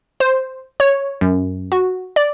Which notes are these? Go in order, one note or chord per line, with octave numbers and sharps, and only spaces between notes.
C5
C#5
F#2
F#4
D5